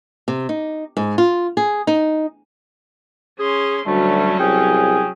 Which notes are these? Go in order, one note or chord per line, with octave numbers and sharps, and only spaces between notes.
C3
D#4
G#2
F4
G#4
D#4
C#4 G#4 C6
D2 F#3 G3 A3 C#4
C2 G#4 G5